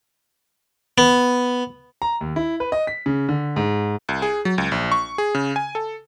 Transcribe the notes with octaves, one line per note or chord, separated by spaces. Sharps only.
B3
A#5
D#2
E4
B4
D#5
B6
C#3
D3
G#2
C2
G#4
F#3
C#2
A#1
C#6
G#4
C#3
G#5
A4